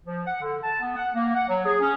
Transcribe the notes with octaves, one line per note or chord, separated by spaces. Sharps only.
F3
F#5
D3
A5
B3
F#5
A#3
F#5
F#3
G#4
C#4